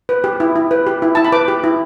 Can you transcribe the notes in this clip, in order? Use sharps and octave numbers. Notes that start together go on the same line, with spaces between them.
B4
G4
E4
E4
B4
G4
E4
E4 A5
B5
B4 D6
G4
E4